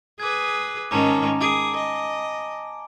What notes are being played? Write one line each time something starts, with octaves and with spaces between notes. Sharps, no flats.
G#4 B4 D6 G#6
G#2 D#3 C#4 A5 A#5 D6
G#4 G#5 D6 D7
D#5